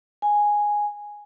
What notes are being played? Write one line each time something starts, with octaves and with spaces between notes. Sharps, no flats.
G#5